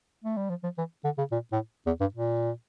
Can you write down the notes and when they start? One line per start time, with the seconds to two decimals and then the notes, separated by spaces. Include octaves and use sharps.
0.24 A3
0.37 G3
0.50 F3
0.64 F3
0.78 E3
1.04 D3
1.18 C#3
1.32 A#2
1.52 A2
1.86 E2
2.01 G2
2.14 A#2